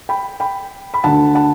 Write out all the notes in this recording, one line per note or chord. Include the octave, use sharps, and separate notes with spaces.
G5 B5
G5 B5
B5
D2 D3 F#5 A5
F#5 A5